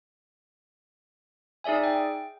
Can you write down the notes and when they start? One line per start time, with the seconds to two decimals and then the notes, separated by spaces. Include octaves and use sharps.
1.64 D#4 G#4 D5 E5 G#5
1.83 G5